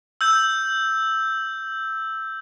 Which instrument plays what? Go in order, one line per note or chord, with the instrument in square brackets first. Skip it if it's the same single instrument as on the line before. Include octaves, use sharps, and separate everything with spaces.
[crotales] E6 G6